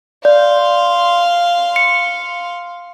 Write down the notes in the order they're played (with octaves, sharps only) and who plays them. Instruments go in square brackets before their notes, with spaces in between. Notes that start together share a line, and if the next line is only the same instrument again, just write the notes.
[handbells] D5 [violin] F5 C6
[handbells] C#7